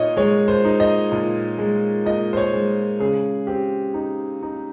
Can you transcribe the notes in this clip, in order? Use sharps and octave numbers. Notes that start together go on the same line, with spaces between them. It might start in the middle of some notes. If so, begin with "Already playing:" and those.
Already playing: A#2 D#4 C#5 D#5
G#3 C#5
C5
D#4
D#5
A#2
G#3
A#2 D#5
C5
C#5
G#3
C#3 G#4
C4 G4
D#4
D#4